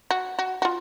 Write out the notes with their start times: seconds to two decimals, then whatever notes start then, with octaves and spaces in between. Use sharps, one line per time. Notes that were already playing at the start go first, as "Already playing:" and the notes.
0.11 F#4
0.39 F#4
0.62 F#4
0.65 F4